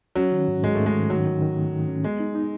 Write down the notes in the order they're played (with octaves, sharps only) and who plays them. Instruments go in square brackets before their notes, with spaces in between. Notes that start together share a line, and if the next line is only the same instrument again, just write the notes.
[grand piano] F#3 [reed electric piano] C#4
[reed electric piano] D#3
G#2
[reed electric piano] G#2 [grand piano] G#3
[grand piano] A3
[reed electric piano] G#2
[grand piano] G#3
[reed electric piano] D#3
[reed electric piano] D#3 [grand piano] F#3
[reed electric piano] D#3
D#3
A3
D#3
C#4
[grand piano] G#3 [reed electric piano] B3
[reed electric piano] D#4
D#4